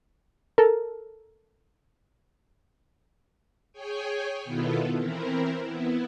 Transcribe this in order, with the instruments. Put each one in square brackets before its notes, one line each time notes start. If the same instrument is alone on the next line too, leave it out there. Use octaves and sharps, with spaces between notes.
[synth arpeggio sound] A4 A#4
[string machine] G#4 C#5 G5 G#5
B2 D#3 B3 E4 F4 A4
E3 C4 E4 A#4
B3 E4